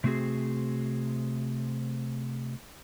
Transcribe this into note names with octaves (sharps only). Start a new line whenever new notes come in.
C3 A3 C4 F#4 G#4